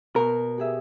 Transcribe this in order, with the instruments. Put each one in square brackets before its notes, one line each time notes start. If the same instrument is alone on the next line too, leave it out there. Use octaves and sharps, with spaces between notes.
[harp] B2 [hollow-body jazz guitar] A#4
[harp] G4 G#4 E5